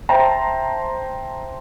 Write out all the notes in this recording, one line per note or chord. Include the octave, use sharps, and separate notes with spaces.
C5 E5 G5 A5 A#5